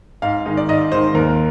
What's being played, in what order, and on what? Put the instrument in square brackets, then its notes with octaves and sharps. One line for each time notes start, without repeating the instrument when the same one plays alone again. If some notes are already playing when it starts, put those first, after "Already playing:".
[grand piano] G#2 F5
D#3 G#3 D#4
D5
G#2 D#5
D#3 G#3 D#4 C5
D#2 A#4